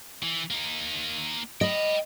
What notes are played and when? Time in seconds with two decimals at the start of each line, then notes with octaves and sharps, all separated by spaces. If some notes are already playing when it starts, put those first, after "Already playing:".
0.23 E3
0.50 A#3 D#4
1.61 D#5 G5 B5